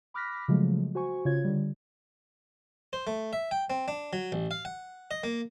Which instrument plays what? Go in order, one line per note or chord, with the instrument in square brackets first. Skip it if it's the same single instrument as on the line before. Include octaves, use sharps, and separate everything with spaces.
[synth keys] B5 D6 F6 F#6 A#6 B6
C#3 F3 F#3 G#3 A3
F#4 C5 G#5 C#6
C#3 F4 C#5 G#6
D3 G3
[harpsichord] C5
A3
E5
G5
C4
D4
F#3
A1
F5
F#5
D#5
A#3